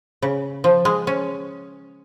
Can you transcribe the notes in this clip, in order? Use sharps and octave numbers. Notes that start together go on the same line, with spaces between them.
C#3
F3
G#3
C#4